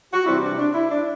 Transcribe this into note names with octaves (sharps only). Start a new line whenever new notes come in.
F#4
C3 E3 G3 C4 E4
D4
D4
E4
D4